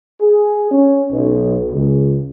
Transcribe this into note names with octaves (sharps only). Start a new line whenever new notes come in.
G#4
C#4
B1
C#2